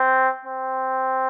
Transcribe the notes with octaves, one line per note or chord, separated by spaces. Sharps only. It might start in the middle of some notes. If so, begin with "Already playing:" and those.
Already playing: C4
C4